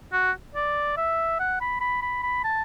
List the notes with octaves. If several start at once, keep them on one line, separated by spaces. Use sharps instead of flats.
F#4
D5
E5
F#5
B5
B5
B5
B5
A5